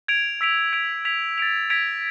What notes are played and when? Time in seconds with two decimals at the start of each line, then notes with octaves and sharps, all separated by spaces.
0.08 G#6 D7 F7
0.41 E6 B6 D7 F7
0.73 G#6 D7 F7
1.05 G#6 B6 F7
1.38 A6 D7 F7
1.70 G#6 B6 D7 F7